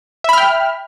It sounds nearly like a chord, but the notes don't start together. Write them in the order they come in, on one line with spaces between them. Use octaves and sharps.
E5 B5 F6 G5